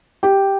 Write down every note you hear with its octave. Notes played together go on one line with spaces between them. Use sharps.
G4